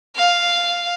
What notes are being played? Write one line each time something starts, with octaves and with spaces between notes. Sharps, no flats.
F5